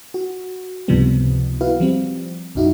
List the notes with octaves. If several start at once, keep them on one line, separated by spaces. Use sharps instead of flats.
F#4
C#2 G#2 C3 F3 G3 B3
E4 F#4 B4 F5
F3 G3 C4
B1 F#2 D#4 E4 F#4